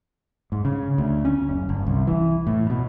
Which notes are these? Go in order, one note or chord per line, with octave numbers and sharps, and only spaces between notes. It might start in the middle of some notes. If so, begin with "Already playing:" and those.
G#2
C#3
D2
C#4
F#1
G1
C2
E3
A2
B2